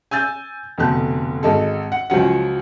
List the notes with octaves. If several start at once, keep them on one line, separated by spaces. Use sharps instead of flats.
G#5 E6 G6 A6
F1 B2 D3 A5 F#6
G#1 G#3 A4
F#5
C#2 F3 F#3 F#5